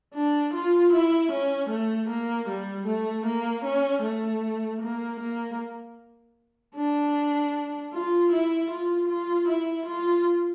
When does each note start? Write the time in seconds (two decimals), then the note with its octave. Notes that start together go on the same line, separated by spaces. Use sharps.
0.14 D4
0.54 F4
0.93 E4
1.32 C#4
1.70 A3
2.09 A#3
2.48 G3
2.87 A3
3.26 A#3
3.65 C#4
4.03 A3
4.82 A#3
5.20 A#3
6.76 D4
7.93 F4
8.32 E4
8.71 F4
9.09 F4
9.48 E4
9.86 F4